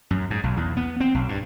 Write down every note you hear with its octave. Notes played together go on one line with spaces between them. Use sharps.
F#2
G#2
B1
E2
B3
C4
B1
G2